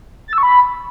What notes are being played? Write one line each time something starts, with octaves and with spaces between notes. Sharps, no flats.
A6
E6
C#6
B5